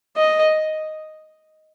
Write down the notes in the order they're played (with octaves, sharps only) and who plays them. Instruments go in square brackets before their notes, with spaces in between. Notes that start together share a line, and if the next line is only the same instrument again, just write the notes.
[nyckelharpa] D#5